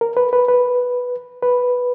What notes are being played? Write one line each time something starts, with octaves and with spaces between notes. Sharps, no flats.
A#4
B4
B4
B4
B4